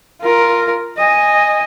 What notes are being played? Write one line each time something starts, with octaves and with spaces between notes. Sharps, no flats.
F4 A#4
D#5 G#5